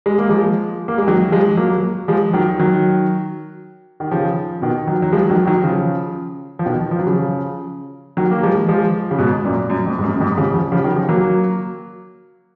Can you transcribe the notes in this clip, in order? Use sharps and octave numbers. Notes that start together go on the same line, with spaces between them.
G#3
A#3
F3 G#3
A#3
G#3
D#3 F#3
F3 G#3
F#3 A#3
F3 G#3
D#3 F#3
D#3 F#3
D#3
C#3 F3
B2 D#3
D#3 F#3
F#3
F3 G#3
D#3 F#3
D#3 F#3
C#3 F3
F3
B2 D#3
F3
F#3
C#3 F3
D#3 F#3
A#3
F3 G#3
F3 G#3
C#3
G#2 B2
F#2 A#2
F#2
F2
G#2
F#2
F#2
F2 G#2
C#3 F3
C#3 F3
C#3 F3
D#3 F#3
C#3 F3
F#3 A#3